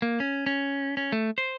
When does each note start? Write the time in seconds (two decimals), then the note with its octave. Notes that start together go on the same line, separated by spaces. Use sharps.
0.02 A#3
0.20 C#4
0.46 C#4
0.97 C#4
1.12 A3
1.38 C5